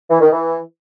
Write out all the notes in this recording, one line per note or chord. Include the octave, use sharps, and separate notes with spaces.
E3
D#3
E3